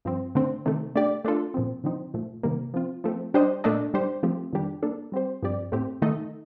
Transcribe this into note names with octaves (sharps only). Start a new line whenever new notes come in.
G2 F3 C4
D3 A3 C4
C3 D#3 A3
A3 D4 G4 D5
A3 D4 F4 A4
A#2 F3 C4
D3 F3 C4 D#4
A#2 F3 A3
C3 D#3 G3 A#3
F3 C4 F4
F3 A3 C4
G3 D4 G4 C5 D#5
A#2 A3 D4 A4 D#5
G3 D4 G4 C5
F3 A3 C4 G4
F2 D#3 G3 D4 G4
A#3 D4 A4
G3 C4 G4 C5
G2 F3 C4 G4 D5
A2 A3 C4 G4
D#3 A3 D#4 A4 D#5